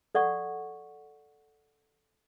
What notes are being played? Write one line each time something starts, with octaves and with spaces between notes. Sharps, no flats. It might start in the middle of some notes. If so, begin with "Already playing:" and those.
A4 D5 F#5 C#6